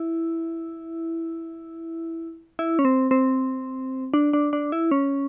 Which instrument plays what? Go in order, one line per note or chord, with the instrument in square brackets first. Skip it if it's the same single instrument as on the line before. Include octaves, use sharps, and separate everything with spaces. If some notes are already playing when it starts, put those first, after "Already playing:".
Already playing: [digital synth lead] E4
E4
C#4
C4
C4
D4
D4
D4
E4
C#4